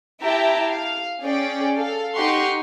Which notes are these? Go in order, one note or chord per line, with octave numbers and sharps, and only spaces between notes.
E4 G4 E5 G5 A5 A#5
F5
C#4 G#4 D5 G5
A4 F5
D#4 G4 F#5 C6 C#6